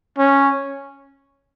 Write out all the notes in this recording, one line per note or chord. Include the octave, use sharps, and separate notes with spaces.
C#4